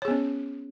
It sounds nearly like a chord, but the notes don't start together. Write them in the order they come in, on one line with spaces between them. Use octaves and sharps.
C#5 G#4 B3 C#4